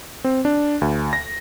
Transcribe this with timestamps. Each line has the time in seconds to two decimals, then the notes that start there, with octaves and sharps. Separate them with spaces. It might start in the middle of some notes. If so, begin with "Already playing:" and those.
0.24 C4
0.45 D4
0.81 D2
1.13 A#6